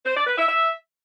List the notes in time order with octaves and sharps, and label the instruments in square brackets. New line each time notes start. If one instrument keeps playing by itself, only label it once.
[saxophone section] C5
D5
B4
E5
E5